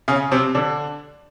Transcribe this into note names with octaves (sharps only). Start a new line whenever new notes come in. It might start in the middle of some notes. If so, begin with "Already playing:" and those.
C#3 C#4
C3 C4
D3 D4